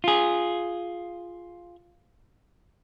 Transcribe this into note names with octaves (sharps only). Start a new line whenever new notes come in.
F4 G#4